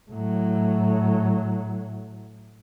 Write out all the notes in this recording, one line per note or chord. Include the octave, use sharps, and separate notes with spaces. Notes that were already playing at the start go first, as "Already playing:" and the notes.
A2 F#3